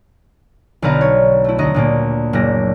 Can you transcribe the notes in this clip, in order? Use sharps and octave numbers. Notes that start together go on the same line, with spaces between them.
B1 D3 B4 F5 A#5
C#5
A3 E4
D2 D#5 A#5
D2 A#2 A#3
F#1 A#2 A#6